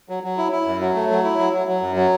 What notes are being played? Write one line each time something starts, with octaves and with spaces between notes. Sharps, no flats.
F#3
F#3
E4
E4
F#2
F#3
A3
F#3
E4
F#3
F#3
F#3
F#2
F#3